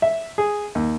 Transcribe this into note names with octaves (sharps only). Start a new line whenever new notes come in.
E5
G#4
D#2